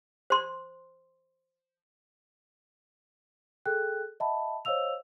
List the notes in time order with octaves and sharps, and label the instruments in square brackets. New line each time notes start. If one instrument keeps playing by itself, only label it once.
[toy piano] C5 C6
[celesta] G#4 A4 G5 F#6
D#5 E5 F#5 A5 B5
C5 C#5 D#5 F5 E6 F7